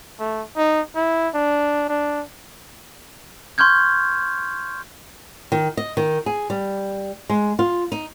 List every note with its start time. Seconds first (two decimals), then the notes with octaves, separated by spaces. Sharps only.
0.20 A3
0.57 D#4
0.96 E4
1.34 D4
1.89 D4
3.58 C6 C#6 F6 G6 G#6
5.52 D#3
5.77 D#5
5.97 D#3
6.26 G#4
6.50 G3
7.30 G#3
7.59 F4
7.92 D#4